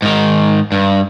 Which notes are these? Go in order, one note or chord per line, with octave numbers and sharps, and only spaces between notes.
G#2 D#3
G2